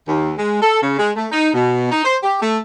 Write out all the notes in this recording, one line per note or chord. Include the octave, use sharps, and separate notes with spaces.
D#2
G#3
A4
C#3
G#3
A3
D#4
B2
D#4
C5
G4
A3